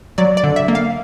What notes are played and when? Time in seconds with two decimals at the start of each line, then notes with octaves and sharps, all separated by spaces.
0.18 F#3 D5
0.37 D5
0.44 D3
0.56 E5
0.68 A#3
0.75 F5